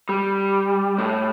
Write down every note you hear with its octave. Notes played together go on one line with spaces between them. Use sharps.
G3
A2